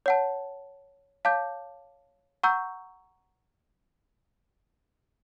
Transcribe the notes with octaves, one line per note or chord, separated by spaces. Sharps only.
C#5 F#5 A5
C#5 F5 A5 D6 G6
F#5 A#5 C#6 E6 G6